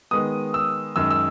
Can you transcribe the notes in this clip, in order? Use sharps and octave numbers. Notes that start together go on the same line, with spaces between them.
D#3 G#3 B3 D#6
E6
F#2 D#3 G#3 E6
E6